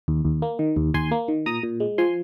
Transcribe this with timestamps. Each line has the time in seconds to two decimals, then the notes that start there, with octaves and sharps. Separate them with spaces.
0.08 D#2
0.25 D#2
0.42 A#3
0.59 D#3
0.76 D#2
0.94 D#2 G#5 C6
1.11 A#3
1.28 D#3
1.46 A#2 A#5 D#6
1.63 A#2
1.80 G#3
1.98 F3 G#5 C6